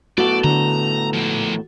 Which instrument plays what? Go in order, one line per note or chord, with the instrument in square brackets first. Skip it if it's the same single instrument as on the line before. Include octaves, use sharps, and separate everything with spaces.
[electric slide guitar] A2 B3 A4 [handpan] F#4 [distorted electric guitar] D5
[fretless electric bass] D3 [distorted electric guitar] A#5
[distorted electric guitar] F3 A#3